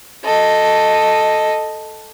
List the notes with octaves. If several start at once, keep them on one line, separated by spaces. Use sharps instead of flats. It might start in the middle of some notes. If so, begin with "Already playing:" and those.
A4 D#5